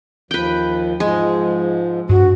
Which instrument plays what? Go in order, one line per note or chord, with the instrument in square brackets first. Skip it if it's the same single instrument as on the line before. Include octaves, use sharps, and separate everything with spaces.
[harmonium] D#2 F3 [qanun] B4 G5
[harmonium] G#2 F3 [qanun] G#3
[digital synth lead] G2 [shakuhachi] F#4